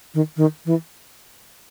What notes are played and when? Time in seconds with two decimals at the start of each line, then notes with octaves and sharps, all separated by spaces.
0.14 D#3
0.37 D#3
0.66 E3